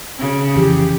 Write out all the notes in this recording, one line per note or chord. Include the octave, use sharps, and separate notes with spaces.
C#3
F1 E3 F3 G4